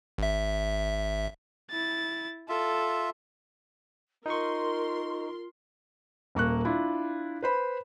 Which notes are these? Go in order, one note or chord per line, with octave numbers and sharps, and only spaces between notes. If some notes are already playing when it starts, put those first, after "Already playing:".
G#1 E5
E4 A6
F4 A4 E5
D#4 F4 A#4 C6 C#6
D#1 A#3 C#6 F#6
D4 E4 F4
B4 C5 B5